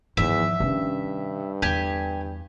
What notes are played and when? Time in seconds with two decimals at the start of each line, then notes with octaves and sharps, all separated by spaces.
0.17 E2 G#2 D#3 F3 E5
0.60 G2 C3 D#3 C#4
1.62 E2 D3 G4 G#5